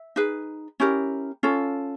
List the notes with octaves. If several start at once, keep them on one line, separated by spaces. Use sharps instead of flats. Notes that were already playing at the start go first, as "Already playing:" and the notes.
Already playing: E5
D#4 G#4 B4
C#4 E4 G4 A#4
C#4 F4 A4